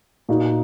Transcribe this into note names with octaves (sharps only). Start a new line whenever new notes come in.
A#2 A#3 D#4 F#4